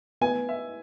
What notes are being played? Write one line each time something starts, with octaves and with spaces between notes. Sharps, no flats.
B3 G#5
E5